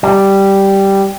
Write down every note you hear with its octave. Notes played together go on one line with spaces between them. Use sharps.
G3